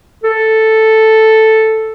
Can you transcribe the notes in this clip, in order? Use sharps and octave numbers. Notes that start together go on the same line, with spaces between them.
A4